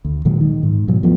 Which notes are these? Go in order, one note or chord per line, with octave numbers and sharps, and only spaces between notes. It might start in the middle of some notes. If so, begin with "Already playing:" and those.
D2
A#2 D#3 F#3 G#3
D#3
G#2
G#2 B2 F#3
D#2 F3 A3 B3